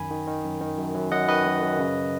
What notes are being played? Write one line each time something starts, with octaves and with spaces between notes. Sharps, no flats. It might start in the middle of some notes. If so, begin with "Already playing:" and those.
Already playing: F#2 D#3 G#5 B5
D#3
D#3
F#2
D#3
F#2
F#2
F#2 D#5 F#5
D#3 B4 D#5
F#2
F#2
C#3